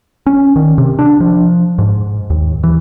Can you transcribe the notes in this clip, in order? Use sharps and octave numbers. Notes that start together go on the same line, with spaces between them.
C#4
D#3
C3
D4
F3
G#2
D#2
E3